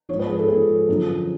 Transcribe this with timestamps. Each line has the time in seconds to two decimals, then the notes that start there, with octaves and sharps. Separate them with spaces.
0.09 F3 C#5
0.14 G#2
0.19 B4
0.29 G#4
0.39 A4
0.48 G#2 F3 G#4
0.88 F#2 D3 F3